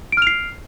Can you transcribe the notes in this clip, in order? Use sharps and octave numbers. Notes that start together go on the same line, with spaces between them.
F6 C7 D7 F7